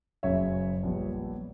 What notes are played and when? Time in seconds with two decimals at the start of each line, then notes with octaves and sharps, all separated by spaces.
0.23 F#1 F#2 C#3 C#5 E5
0.83 A#1 A#2 G3 B3